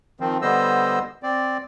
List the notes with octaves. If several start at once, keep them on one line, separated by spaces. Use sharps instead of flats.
D#3 F3 C4
D3 G3 B3 C5 D#5 E6
C4 D5